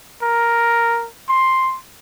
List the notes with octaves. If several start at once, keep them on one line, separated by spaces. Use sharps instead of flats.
A#4
C6